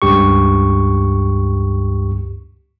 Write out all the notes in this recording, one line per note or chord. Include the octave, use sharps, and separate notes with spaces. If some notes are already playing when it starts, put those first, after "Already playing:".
C#2 G2 G4 C#6